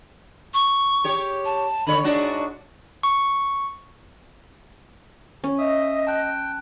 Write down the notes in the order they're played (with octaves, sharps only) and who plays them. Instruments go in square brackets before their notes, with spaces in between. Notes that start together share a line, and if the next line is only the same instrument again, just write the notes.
[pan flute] C#6
[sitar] G4 C#5
[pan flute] A5
[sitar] D3 C#5 [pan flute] B5
[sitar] G#2 D4 F#4 [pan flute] D5
[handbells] C#6
[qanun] C#4
[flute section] D#5 [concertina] E5 D#6
[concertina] G5 [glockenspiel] A5 F#6